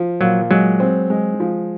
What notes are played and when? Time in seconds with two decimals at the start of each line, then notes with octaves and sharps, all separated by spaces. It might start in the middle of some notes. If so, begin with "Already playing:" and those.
Already playing: F3
0.20 A#2 F#3
0.51 F#3 G#3
0.80 C4
1.10 G#3
1.40 F3